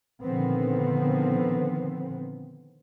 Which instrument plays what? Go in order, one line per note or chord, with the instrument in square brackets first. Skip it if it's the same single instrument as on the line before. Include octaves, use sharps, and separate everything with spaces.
[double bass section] A#2 D3 D#3 F3 B3 C4